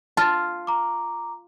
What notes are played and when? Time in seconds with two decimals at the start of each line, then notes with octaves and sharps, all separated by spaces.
0.17 F4 A5
0.67 A#5 D6